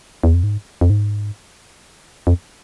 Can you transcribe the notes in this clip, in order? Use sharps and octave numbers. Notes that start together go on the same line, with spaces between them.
E2
F2
G#2
F2
G#2
F2